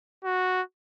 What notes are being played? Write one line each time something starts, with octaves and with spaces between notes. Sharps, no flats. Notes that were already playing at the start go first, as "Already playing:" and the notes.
F#4